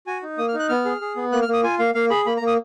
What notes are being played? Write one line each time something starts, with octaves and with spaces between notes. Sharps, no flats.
F#4 G#5
D#4
A#3 D#6
F6
D#4
F#6
B3 F6
G#4
G#4
B3
A#3 F#6
F6
A#3 D#6
F4 G#5
A#3 F5
A#3 F5
G#4 B5
A#3 B5
A#5
A#3
D#6